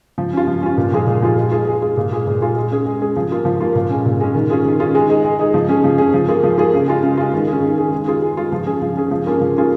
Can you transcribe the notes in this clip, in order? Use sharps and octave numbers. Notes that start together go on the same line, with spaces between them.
F3
C#4 F4
F3
C#4 F4
A#2
F3 G#3 F4 G#4
A#2
F3 G#3 F4 G#4
G#3
F4 G#4
G#3
F4 G#4
A#2
G#3 F4 G#4
A#2
G#3 F4 G#4
G#3
C#4 G#4
G#3
C#4 G#4
F3
A#3 F4
F3
A#3 F4
A#2
G#3 C#4
A#2
G#3 C#4
D#3
C#4 F4 G#4
D#3
C#4 F4 G#4
G#3
D#4 G#4
G#3
D#4 G#4
F3
C#4 G#4
F3
C#4 G#4
F3
A#3 F4 G#4
F3
A#3 F4 G#4
C#3
G#3 F4
C#3
G#3 F4
D#3
C#4 G#4
D#3
C#4 G#4
G#3
F4 G#4
G#3
F4 G#4
F3
C#4 G#4
F3
C#4 G#4
F3
A#3 C#4 F4 G#4
F3
A#3 C#4 F4 G#4